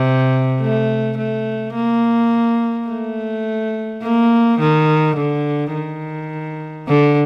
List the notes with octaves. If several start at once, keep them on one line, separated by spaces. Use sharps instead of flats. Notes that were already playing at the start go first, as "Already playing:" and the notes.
Already playing: C3
A3
A3
A#3
A3
A#3
D#3
D3
D#3
D3